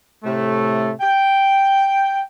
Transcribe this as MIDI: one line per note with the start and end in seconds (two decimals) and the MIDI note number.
0.24 0.91 45
0.24 0.91 48
0.24 0.91 57
1.01 2.20 79